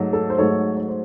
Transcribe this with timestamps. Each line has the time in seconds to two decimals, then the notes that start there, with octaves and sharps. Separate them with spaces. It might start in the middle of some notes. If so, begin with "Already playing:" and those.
Already playing: G#2 F#3 A3
0.13 A4
0.30 C5
0.38 G#2 F#3 A3 A4 C#5
0.77 C#5
0.89 C5